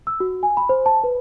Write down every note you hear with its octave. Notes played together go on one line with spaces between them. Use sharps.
E6
F#4
G#5
B5
C5
A5
B4